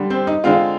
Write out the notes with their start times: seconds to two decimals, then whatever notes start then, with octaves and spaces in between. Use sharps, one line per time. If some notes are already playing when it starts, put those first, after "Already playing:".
Already playing: D3 G3
0.10 C4 C5
0.27 D#4 D#5
0.44 D3 G#3 C4 F4 F5